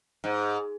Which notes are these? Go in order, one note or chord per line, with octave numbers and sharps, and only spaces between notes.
G#2